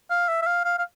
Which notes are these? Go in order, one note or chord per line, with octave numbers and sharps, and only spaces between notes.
F5
E5
E5
F5
F5
F5